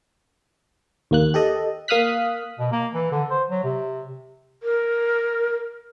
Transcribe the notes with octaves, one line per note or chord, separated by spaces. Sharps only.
D#2 A#3 F#6
G4 A4 D#5
A#3 F5 D#6 F6 F#6 B6
B2
A#3
E3
D3
C5
F#3
C3
A#4